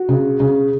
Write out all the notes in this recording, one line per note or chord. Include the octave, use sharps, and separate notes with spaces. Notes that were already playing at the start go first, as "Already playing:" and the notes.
Already playing: F#4
C#3
C#3